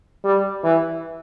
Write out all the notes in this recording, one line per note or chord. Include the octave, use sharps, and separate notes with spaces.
G3
E3